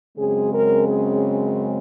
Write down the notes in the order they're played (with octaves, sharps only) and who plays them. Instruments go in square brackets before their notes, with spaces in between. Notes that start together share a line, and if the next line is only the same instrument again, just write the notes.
[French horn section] F#2 C#3 G#3 C4 G#4
A#4
G#4